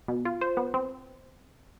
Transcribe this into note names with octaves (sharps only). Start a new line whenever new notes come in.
B2
F4
C5
B3
C4